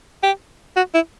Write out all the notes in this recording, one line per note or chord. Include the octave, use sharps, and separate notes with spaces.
G4
F#4
E4